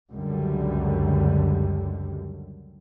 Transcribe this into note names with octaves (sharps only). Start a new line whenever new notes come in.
C#2 F#2 D3 G3